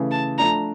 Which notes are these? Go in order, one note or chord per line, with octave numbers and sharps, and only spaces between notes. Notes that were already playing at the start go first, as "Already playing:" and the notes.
Already playing: C#3 E3 A3
A5
F3 A3 D4 A#5